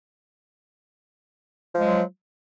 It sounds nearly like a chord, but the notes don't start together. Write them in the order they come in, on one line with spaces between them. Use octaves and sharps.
F3 G#3 F#3